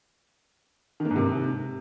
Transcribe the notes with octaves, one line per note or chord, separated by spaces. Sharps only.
D#3
A#3
G#2
C3